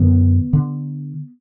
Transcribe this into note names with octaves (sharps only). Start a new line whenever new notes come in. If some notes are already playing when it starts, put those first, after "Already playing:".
Already playing: F#2 D3 B3
D3